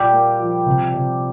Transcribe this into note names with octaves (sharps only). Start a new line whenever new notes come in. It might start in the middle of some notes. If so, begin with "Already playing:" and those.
Already playing: A#2 G3 G4
A#3
F3
C3
C3